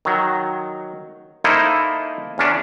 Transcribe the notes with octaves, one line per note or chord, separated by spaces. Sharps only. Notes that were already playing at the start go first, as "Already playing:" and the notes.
D#3 F#3
A#3 D#4 E4 A4 C5
E2 C#4 D4